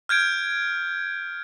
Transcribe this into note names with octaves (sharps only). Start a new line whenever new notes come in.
F6 G6 G#6 D7